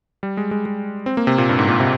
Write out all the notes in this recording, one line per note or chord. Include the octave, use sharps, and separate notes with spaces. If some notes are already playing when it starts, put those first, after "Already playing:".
G3
G#3
G#3
G#3
C4
A#3
C3
A#2
G2
G#2
A#2
C3